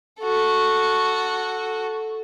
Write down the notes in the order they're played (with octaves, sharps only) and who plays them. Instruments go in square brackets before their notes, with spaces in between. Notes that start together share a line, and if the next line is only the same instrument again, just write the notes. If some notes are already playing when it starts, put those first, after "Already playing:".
[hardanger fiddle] F#4 A4